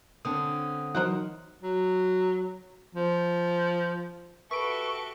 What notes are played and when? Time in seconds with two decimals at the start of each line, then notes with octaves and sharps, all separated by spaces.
0.25 D3 C4 C#4 D#6
0.95 E3 F#3 D#4 A#4 C5 F#5
1.63 F#3
2.95 F3
4.51 F#4 G4 A4 B4 E5 C#6 D7